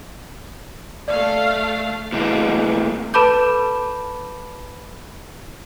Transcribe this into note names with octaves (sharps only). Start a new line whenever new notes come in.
A3 D5 F5
A2 C3 E3 G#3 A#3
A4 B4 A5 B5 D6 G6